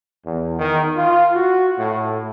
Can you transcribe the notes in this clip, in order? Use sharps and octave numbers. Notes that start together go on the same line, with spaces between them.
E2
D#3
F4
F#4
A2